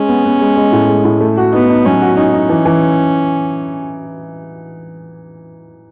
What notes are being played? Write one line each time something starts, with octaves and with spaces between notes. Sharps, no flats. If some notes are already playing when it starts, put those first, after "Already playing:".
Already playing: G#3 C#4
B3
B3
G#3
G#3
A2
G#3
A2
A3
F#4
B3 D#4
D#4
F#3 C#4
F#4
C#4 D#4
D#4
E3
E3